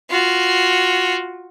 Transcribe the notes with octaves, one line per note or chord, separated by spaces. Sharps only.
F4 F#4